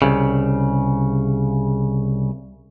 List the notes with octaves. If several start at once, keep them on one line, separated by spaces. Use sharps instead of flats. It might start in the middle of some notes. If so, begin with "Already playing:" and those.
C2 C#3